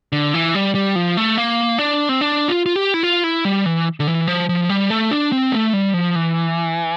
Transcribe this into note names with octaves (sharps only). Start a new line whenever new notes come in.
D3
E3
G3
G3
F3
A3
A#3
D4
C4
D4
F4
F4
G4
E4
F4
E4
G3
E3
D3
E3
F3
F3
G3
A3
D4
C4
A3
G3
F3
E3